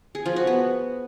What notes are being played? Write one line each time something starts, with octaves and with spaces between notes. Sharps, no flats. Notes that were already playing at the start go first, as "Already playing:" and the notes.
G#4
F3
F#4
B3